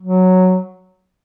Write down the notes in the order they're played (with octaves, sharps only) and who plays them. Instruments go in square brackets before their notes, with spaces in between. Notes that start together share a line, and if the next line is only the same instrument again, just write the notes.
[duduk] F#3